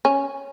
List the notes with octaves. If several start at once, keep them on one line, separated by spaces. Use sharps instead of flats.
C#4